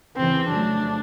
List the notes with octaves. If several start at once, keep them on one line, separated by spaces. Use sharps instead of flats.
E2 C#3 E3 C4
F2 C#3 F#3 A3 D4